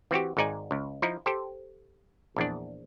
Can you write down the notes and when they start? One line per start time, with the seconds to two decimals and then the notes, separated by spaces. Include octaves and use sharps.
0.11 E3 C4 F#4 G4
0.37 G#1 G#2 D#4 D5 G#5
0.71 C#2
1.02 F3 D#4 E4
1.26 G4 A4 C5
2.36 A#1 E2 D4